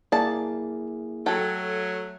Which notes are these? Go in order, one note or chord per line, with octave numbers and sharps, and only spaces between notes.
A#3 E4 G#4 D5 A5
F#3 A3 A4 G5